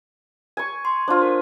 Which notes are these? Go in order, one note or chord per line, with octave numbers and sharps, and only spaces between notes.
G#5 C#6
C6
D4 F4 C5
A#4